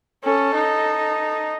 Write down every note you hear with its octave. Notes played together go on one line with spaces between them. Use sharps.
C#4 A4
D#4